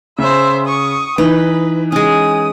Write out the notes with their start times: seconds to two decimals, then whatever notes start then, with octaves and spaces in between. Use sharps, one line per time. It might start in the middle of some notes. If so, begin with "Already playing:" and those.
0.19 C#3 C5 E5
0.66 C#6 D#6
1.18 E3 D#4 B4
1.92 G#3 C#4 D#6